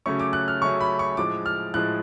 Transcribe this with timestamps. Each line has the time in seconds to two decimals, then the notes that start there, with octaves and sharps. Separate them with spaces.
0.06 C#3 F#3 A3 C#4 C#6
0.20 D6
0.33 F#6
0.48 F6
0.62 C#3 F#3 A3 C#4 C#6
0.81 B5
0.99 C#6
1.17 A2 F3 G#3 D6
1.46 F6
1.74 A2 F3 G#3 F#6